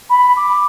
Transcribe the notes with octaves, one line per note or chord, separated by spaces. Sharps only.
B5
D6